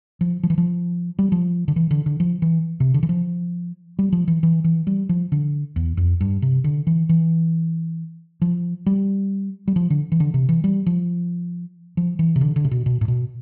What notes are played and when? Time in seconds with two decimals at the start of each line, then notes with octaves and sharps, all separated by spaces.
0.21 F3
0.43 F3
0.50 E3
0.58 F3
1.19 G3
1.32 F3
1.68 D3
1.76 E3
1.91 D3
2.06 D3
2.20 F3
2.42 E3
2.80 C3
2.94 D3
3.03 E3
3.09 F3
3.99 G3
4.13 F3
4.28 E3
4.43 E3
4.64 E3
4.87 G3
5.09 F3
5.32 D3
5.76 E2
5.97 F2
6.21 G2
6.42 C3
6.64 D3
6.87 E3
7.09 E3
8.42 F3
8.86 G3
9.68 G3
9.76 F3
9.90 D3
10.12 E3
10.20 D3
10.34 C3
10.49 E3
10.64 G3
10.86 F3
11.97 F3
12.19 E3
12.36 C3
12.41 D3
12.56 D3
12.65 C3
12.71 B2
12.86 B2
13.01 A2
13.08 B2